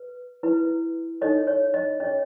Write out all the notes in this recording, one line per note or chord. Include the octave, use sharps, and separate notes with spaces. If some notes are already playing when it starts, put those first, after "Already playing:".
Already playing: B4
E4 B4
D#4 A4 C#5 D#5
C#5
D#5
C#4 G#4 C#5 D#5